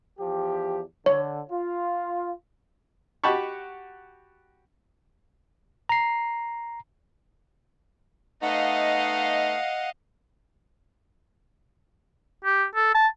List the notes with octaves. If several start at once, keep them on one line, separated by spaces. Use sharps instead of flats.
E2 F3 G4
D3 C#5
F4
F#4 G4 G5 A5 B5 C#6
A#5 C7
A3 B3 D#4 D#5 F5 F#5
G4
A4
A5